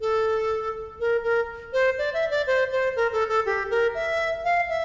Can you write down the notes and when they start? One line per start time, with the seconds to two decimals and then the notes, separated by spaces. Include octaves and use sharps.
0.01 A4
1.00 A#4
1.23 A#4
1.73 C5
1.98 D5
2.14 E5
2.31 D5
2.47 C5
2.72 C5
2.96 A#4
3.13 A4
3.29 A4
3.46 G4
3.70 A#4
3.95 E5
4.44 F5
4.69 E5